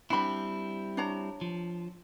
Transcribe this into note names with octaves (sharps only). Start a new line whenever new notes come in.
G3 C4 D4 E4 B5
D4 C#5 A#5
F3